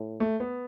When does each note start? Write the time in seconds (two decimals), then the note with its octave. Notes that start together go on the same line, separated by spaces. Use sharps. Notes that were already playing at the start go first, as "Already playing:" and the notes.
Already playing: A2
0.20 A3
0.40 B3